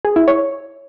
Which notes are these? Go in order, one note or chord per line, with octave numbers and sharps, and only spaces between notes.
G#4
E4
C#5